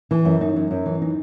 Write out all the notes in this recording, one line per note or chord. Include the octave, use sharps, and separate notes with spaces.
E3
F#2
D#4
F#2
F#2
E3
D#4